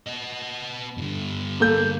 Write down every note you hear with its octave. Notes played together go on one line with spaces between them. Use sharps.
B3 D#5
G2 D3
A#3 A4 G6